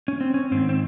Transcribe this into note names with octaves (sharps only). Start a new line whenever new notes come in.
C#4
C4
C#4
G#2 D#3 C4
C4